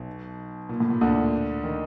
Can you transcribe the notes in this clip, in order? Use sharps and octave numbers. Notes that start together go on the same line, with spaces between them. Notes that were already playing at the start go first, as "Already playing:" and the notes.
Already playing: B1 B2
A#2
A2
A#2
D2 D3
D#3